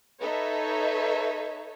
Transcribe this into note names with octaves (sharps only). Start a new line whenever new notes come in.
D#4 A4 B4 C#5 D#5 E5